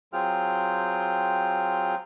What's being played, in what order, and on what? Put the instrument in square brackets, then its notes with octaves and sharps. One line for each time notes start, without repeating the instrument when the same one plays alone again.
[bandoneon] F#3 C4 F4 G#4 G5 F6